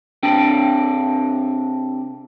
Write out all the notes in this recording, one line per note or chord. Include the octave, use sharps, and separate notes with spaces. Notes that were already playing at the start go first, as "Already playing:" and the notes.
C3 D4 G5